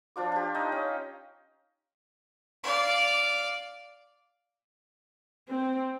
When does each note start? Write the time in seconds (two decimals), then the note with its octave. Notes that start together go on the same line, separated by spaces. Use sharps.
0.16 F3 D4 F4 D6
0.32 D4 G4
0.54 D#4 D#5 F5 G5
0.72 C#4
2.64 D5 F5
5.49 C4